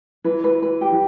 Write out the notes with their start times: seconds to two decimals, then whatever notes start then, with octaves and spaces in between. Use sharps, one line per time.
0.24 E3 B4
0.44 B4
0.62 B4
0.81 G4
0.92 E3